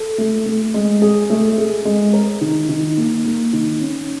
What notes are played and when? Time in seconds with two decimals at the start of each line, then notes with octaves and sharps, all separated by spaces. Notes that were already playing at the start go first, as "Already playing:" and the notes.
Already playing: A4
0.18 A3
0.46 A3
0.74 G#3
1.02 G#4
1.30 A3
1.58 G#4
1.85 G#3
2.13 A#4
2.41 D#3
2.69 D#3
2.97 A#3
3.25 A#3
3.53 D#3
3.80 C#4